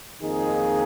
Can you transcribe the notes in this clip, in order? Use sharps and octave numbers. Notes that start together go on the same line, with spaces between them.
F2 D#3 A#3 D#4 G#4